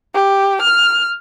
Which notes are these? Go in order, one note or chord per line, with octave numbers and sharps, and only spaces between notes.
G4
F6